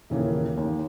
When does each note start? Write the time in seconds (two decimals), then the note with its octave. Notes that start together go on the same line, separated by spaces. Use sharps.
0.10 D#1 C#3 E3 A#3
0.57 D#2